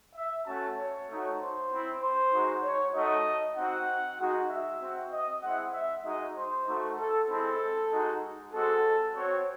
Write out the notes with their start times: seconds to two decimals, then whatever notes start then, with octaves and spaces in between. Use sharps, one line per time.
0.15 E5
0.46 A3 C#4 F#4 A5
0.78 C#5
1.08 A3 D#4 F#4
1.39 C5
1.70 C4 E4
2.02 C5
2.32 G#3 D#4 F#4
2.63 C#5
2.94 A3 D#4 F#4 D#5
3.56 C4 D#4 F#4 F#5
4.18 G#3 D#4 F#4
4.49 E5
4.80 C4 F#4
5.12 D#5
5.42 G#3 C4 E4 F#5
5.73 E5
6.04 G#3 D#4 F#4 D#5
6.35 C5
6.66 A3 D#4 F#4
6.98 A4
7.28 G#3 C4 E4 A4
7.90 G#3 D#4 F#4
8.52 G#3 C4 F#4 A4
9.14 C4 F#4 C#5